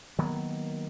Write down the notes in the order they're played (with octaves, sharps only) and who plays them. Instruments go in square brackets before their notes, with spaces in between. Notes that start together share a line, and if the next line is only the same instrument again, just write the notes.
[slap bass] D#3 F#3 A#3 B3